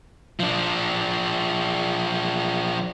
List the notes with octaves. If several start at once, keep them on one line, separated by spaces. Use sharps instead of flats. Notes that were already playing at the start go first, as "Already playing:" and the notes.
F3 D4